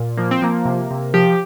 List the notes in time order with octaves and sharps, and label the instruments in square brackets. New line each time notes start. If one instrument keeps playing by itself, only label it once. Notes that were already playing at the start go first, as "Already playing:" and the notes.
Already playing: [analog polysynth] A#2
F3 A#3
C4
F3 A#3
C3
C3
F3 G4